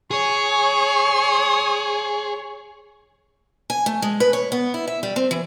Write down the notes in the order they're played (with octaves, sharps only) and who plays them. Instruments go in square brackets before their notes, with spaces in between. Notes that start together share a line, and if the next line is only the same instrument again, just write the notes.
[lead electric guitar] G#4 [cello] C#5
[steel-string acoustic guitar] G#5
A3
G#3
B4
C#5
B3
E4
E5
G3
C4
E3